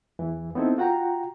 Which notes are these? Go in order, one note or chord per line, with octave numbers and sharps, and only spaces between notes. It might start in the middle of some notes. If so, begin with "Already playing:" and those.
E2 E3
B3 C4 D#4 E4 A4
F4 F#4 F#5 G5 A#5